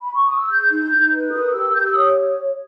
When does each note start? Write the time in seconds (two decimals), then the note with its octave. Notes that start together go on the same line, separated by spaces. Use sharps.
0.01 B5
0.13 C#6
0.26 D#6
0.38 E6
0.49 G#4 G6
0.71 D#4
0.91 D#4
1.11 B4
1.32 A#4 D#6
1.52 G4 E6
1.73 G4 G6
1.86 E6
1.94 C#5 D#6